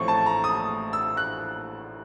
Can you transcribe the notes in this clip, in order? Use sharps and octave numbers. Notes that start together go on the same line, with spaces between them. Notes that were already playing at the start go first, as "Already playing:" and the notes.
Already playing: A1 A2 F3 A3 C4 C#6
A5
A#5
D#6
E6
F#6